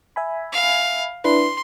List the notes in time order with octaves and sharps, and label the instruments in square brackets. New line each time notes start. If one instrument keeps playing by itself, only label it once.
[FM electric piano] E5 G#5 B5
[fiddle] F5
[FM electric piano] D4 E4 B4 [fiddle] C6